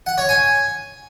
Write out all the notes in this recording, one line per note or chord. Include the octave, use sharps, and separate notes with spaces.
F#5
C#5
G#5